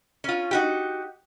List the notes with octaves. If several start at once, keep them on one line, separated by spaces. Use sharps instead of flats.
C#4 F4
D#4 F#4 G4